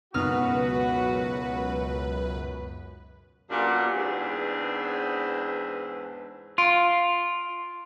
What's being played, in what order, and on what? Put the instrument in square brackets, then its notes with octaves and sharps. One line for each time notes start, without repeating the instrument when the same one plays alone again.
[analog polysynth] C#2 F#2 B4 [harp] B2 D#4 F6 [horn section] F#4
[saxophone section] F#2 A#2 B3 D4 G4 F#5
E2 G#2 C4 D4 G#4 B4
[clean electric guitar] F4 [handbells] C6 D7